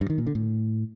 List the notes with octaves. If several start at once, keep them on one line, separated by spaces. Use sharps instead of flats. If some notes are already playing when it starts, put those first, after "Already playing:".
G2
D#3
A#2
D3
A2